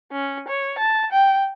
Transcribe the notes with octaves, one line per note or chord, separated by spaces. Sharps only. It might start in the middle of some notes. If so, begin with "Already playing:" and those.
C#4
C#5
A5
G5